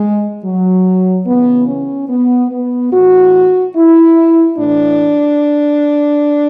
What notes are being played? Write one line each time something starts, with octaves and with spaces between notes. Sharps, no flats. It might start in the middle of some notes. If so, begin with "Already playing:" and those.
Already playing: G#3
F#3
C#3 E3 B3
C#4
B3
B3
A2 E3 F#4
E4
A2 E3 D4